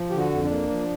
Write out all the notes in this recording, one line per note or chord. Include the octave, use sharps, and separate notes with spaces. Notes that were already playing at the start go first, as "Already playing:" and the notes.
Already playing: F3
D3 G4
F#4
F2
D4
A#3
F3